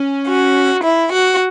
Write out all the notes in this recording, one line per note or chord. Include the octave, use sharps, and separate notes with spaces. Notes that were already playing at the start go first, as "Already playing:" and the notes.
Already playing: C#4
F#4
E4
F#4